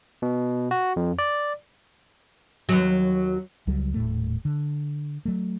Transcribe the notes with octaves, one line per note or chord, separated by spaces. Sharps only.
B2
F#4
F2
D5
D#2 F#3
C#2 F#3 G3
D#1 A2 A3
D3
F#3 A3